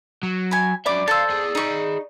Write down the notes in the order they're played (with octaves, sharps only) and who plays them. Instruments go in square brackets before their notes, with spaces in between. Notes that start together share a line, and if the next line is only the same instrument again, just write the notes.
[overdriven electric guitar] F#3
[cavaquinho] G#5 B5
[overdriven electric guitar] F#3 E5 [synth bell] D5 [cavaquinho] B5 D6
[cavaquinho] A4 C5 [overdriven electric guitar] F5 [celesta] E6 A6
[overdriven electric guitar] B3 G#4
[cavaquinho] D#4 C#6 [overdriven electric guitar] G#4 B5